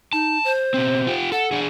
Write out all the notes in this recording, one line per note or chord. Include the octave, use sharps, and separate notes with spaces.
D#4 A5
C5
B2 C4
F4 G4
A4 F#5
D4 G#4